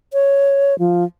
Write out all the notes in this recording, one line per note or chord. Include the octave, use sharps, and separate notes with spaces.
C#5
F3